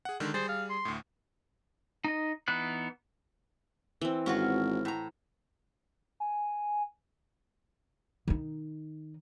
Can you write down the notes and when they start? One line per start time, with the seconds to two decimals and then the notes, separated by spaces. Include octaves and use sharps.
0.05 G#4 F#5
0.20 D3 D#3 G#3
0.34 G3 G#4 C5 A6
0.49 F5
0.70 C6
0.85 D2 A2
2.04 D#4 D#5
2.48 E3 B3 D#4 F#6
4.01 E3 C4
4.26 G#1 C#4 F4 F#4
4.85 A2 A#5
6.20 G#5
8.28 D#3 D#4